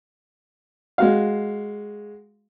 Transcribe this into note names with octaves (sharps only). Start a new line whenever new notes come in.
G#3 F#4 F5